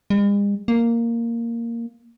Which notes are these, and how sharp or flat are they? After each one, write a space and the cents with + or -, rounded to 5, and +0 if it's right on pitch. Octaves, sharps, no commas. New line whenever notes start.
G#3 -45
A#3 -5